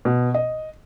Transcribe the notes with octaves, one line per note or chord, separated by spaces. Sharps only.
B2
D#5